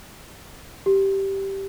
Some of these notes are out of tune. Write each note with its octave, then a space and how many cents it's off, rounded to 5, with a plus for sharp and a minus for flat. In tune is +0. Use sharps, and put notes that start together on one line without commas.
G4 -10